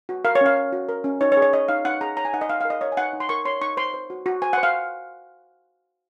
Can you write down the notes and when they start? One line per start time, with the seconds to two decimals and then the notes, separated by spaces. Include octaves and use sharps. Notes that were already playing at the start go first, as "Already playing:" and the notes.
0.09 F#4
0.25 A#4 F5
0.35 C#5
0.41 C#4 F5
0.56 C#5
0.73 F#4
0.89 A#4
1.04 C#4
1.21 D#4 C#5
1.32 C#5
1.37 G#4
1.42 C#5
1.53 C#5 D#5
1.68 D#4 F5
1.85 D#4 F#5
2.01 G#4 A#5
2.17 C#5 A#5
2.25 G#5
2.33 D#4 F#5
2.41 D#5
2.49 D#4 F5
2.61 A#4 F5
2.70 D#5
2.81 C#5 D#5
2.92 G#5
2.97 D#4 F#5
3.13 D#4
3.20 C6
3.29 A#4 C#6
3.45 C#5 C6
3.61 D#4 C#6
3.77 C5 C6
3.94 C5
4.10 F#4
4.26 F#4
4.42 C5 G#5
4.53 C5 F#5
4.63 F5